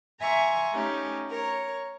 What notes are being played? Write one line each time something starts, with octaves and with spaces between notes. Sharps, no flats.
E5 G#5 A#5 C6 C#6
A3 C#4 D#4 G4
A#4 C#5